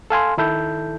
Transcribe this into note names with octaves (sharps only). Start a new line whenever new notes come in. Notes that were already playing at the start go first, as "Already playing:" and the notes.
A4 F5 G#5 C6
D#3 E4 A4 G6